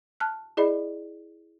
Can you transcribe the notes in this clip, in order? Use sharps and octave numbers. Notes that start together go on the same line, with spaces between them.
A5 F6 F#6
E4 G#4 D5 D#5 B5